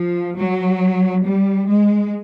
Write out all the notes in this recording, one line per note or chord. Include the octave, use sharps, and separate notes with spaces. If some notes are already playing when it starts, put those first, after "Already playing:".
Already playing: F3
F#3
G3
G#3